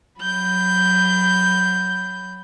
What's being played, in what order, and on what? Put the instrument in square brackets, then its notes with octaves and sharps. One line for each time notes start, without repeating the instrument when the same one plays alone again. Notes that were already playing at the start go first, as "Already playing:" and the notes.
[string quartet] F#3 B5 G6